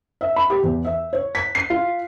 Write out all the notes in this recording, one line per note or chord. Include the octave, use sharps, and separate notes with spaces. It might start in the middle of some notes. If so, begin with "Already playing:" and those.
E5
B5
G4
E2
E5
C#5
B6
C7
F4